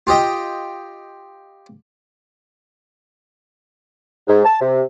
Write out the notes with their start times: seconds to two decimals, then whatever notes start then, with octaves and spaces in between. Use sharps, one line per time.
0.07 F4 G4 D#5 G5
4.28 G#2
4.45 A5
4.60 C3